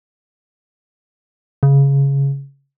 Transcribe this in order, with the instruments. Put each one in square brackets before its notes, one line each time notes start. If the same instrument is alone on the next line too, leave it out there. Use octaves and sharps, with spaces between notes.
[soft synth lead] C#3